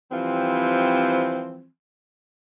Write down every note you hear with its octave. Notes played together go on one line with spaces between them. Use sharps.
E3 F3 G3 C4